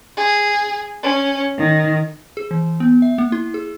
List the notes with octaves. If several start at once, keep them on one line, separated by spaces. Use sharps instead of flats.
G#4
C#4
D#3
G#4
E3
B3
E5
A#3
E4
G#4